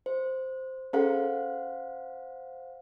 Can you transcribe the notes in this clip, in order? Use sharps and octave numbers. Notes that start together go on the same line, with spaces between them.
C5
C#4 G#4 A4 C5 F5 F#5